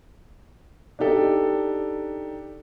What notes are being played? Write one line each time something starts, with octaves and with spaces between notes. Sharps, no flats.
D4 D#4 G4 A4